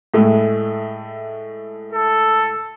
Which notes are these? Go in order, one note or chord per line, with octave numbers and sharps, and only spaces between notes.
A2 G#3 A3
A4